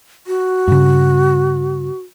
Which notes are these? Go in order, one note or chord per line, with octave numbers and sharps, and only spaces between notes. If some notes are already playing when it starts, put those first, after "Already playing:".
F#4
G2 C#3